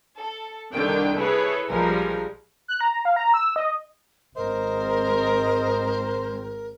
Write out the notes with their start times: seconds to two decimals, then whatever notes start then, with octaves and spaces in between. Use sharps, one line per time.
0.18 A4
0.74 C2 D3 D#3 D4 G5
1.19 E4 G#4 A4 B4 C#5
1.69 A#1 F3 G3 G#3 A#4 G#5
2.68 F#6
2.81 A#5
3.05 F5
3.16 A#5
3.34 E6
3.56 D#5
4.37 G#1 G#3 C4 A#4 C5 D#5